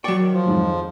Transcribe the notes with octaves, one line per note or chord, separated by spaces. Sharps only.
F#3 D5 G5 C#6
D#3
F3
F2 G#2 D#3